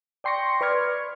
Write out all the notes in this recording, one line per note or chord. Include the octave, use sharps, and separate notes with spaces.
D5 G5 C6 C#6 A#6 C#7
B4 D5 C#6 F6 G#6